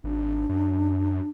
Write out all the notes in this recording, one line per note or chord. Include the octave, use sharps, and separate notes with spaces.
G#1 D4
F#2